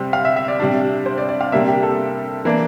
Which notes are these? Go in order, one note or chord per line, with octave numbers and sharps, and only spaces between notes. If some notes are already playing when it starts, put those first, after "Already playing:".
Already playing: C3 G3 C4
F5
E5
E5
D5
C3 G3 D4
C5
D5
D5
F5
C3 G3 A#3 D4 E5
G4
A4
E3 A#3 D4